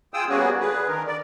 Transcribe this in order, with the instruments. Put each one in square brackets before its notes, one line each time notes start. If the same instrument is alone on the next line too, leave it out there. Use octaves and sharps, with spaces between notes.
[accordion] F4 G#4 G5 D#6 E6
G3 A#3 B3 C#4 F#4 G#4
D3 G#4 B4
D3 D#3 A#4
D5